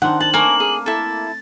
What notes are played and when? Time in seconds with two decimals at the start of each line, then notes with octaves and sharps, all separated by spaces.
0.02 D#3 C4 D4 F#5
0.20 C5 A5 F#7
0.34 A3 A#3 A#4 G#5
0.60 G#4
0.86 E4 A4 A6